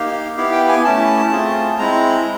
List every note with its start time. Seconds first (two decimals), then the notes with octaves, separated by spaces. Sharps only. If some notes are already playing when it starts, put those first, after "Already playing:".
Already playing: A#3 D#4 G4 F5
0.37 B3 E4 G4 F5
0.52 G5
0.68 G#5
0.85 A3 C#4 E4 A5
1.32 A3 C4 F4 G#4
1.78 G#3 C4 E4 A#5